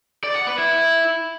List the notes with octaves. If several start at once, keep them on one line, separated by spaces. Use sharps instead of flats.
D5
F#5
B4
E4